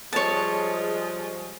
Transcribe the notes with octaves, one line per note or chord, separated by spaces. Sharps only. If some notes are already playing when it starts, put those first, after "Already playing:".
F3 G3 G#3 C#5 A5